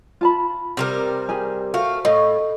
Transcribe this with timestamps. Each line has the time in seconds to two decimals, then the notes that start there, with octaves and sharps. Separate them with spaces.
0.21 F4 A5 B5
0.77 C3 G3 A#4
1.29 G4 G#4 G#5
1.74 A3 F#4 C5 F5
2.05 A2 D#5